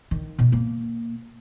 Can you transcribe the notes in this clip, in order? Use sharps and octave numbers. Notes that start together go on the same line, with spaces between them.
D#3
B2
A#3